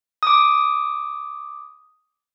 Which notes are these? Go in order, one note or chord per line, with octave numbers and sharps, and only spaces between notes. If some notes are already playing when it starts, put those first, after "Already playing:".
D6 D#6